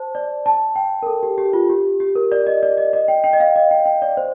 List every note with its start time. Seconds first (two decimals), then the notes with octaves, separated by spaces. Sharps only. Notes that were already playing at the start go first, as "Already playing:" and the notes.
Already playing: C5 A5
0.15 D5
0.46 A5
0.76 G5
1.02 A#4
1.07 A4
1.23 G4
1.38 G4
1.53 F4
1.70 G4
2.00 G4
2.16 A#4
2.32 D5
2.47 D#5
2.63 D5
2.77 D#5
2.93 D#5
3.08 G5
3.24 G5
3.33 D#5
3.40 F5
3.56 D#5
3.71 G5
3.85 G5
4.02 D5
4.17 C5